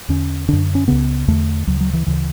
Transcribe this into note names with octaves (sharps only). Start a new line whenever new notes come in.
E2 D3 C#4
F#2 D3 D4
C#4
C#2 C#3 B3
E2 D3 A3
D2 C#3 F#3
F#3
E3
D2 C#3 E3